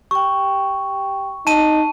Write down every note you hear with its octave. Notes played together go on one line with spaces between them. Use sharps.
G4 G5 C#6
D#4 A5 D#7